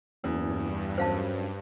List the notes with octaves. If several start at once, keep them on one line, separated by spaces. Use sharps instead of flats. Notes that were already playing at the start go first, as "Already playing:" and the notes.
F#1 E2 G2
F#2 C5 F5 A5